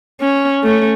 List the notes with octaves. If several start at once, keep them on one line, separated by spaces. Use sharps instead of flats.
C#4
A3 C#4